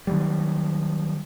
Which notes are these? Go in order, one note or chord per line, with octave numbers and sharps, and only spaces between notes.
D#3 F#3 G3